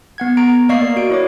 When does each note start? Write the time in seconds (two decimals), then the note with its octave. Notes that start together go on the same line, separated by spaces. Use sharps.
0.18 B3 F#5 G#6
0.37 B3 A#5 D7
0.69 A#3 D5 D#5 F5 C#6 C7
0.81 A#4 D5
0.96 F#4 D7
1.10 E4 C#5 D6